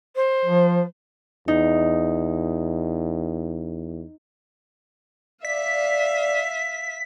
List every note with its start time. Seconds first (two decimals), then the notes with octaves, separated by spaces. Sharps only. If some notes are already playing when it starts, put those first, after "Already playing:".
0.16 C5
0.45 F3
1.48 E2 D#4
5.45 D5 E5 F5 B6